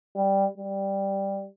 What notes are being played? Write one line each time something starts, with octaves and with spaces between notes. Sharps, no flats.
G3
G3